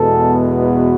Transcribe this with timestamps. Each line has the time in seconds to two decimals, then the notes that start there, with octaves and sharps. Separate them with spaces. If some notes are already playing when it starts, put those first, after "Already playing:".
Already playing: E2 B2 G#3 B3 A4
0.59 F#4